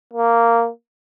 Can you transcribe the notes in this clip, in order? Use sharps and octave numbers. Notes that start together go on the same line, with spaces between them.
A#3